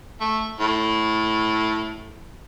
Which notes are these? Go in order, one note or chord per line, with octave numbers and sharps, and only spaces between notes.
A3
A2